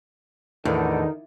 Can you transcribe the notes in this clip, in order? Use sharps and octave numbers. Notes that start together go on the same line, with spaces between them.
E2 A2 D3 D#3 D#4